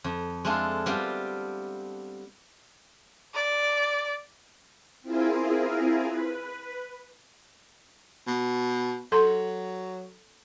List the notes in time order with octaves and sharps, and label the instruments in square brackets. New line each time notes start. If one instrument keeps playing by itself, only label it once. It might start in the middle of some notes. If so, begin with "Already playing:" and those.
[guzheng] F2
G#3 A3 C4 D4 F4
G3 B3 C4 F4 G4
[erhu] D5
[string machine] C4 E4 F4 G#4 A#4
B4
[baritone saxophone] B2
[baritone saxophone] F#3 [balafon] A4 C6